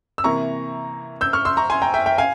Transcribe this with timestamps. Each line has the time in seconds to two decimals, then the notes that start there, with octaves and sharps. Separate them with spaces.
0.18 E6
0.24 C3 E3 A#3 A#5 C#6
1.21 E6 G6
1.33 C#6 F6
1.45 C6 E6
1.57 A#5 C#6
1.70 G#5 C6
1.82 G5 A#5
1.94 E5 G5
2.06 E5 G5
2.18 F5 G#5